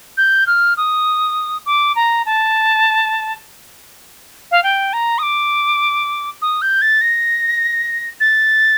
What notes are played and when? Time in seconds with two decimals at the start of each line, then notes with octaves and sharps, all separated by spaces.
0.17 G6
0.47 F6
0.77 D#6
1.66 D6
1.96 A#5
2.26 A5
4.51 F5
4.63 G5
4.93 A#5
5.18 D#6
5.23 D6
6.42 D#6
6.62 G6
6.82 A6
7.01 A#6
8.20 A6